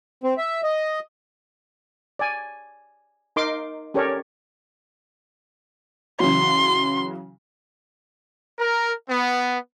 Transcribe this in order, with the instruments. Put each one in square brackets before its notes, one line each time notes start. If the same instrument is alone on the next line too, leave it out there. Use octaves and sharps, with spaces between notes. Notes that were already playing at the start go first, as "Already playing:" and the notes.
[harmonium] C4
E5
D#5
[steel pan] D5 G#5
D#4 A#4 C6 D6
C#4 G4 A4 A#4 C#5 D5
[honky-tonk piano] C#3 E3 F#3 [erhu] C6
[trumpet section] A#4
B3